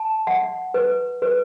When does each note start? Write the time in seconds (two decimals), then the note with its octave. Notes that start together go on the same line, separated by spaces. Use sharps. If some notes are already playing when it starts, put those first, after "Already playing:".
Already playing: A5
0.27 F#5
0.74 B4
1.22 B4